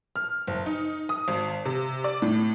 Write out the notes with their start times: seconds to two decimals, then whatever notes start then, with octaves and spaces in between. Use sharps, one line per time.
0.16 F6
0.47 F#1
0.66 D#4
1.09 D#6
1.28 G#1
1.65 C3
2.04 D5
2.22 A2